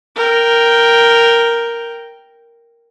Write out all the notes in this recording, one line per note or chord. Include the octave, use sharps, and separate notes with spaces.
A#4 G5